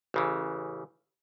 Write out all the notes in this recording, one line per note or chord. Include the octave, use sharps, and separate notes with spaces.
A1 C#3 E3